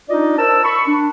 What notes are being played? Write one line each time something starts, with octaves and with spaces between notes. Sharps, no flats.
D4 D#4 F4 D5 D#5
A#4 C5 A5 E6
B5 C#6
D4